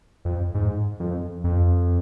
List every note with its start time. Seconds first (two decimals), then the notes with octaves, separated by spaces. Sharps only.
0.25 F2
0.55 G#2
1.00 F2
1.44 F2